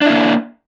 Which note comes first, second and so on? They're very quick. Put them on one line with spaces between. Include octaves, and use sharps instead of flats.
D4 E4 A#3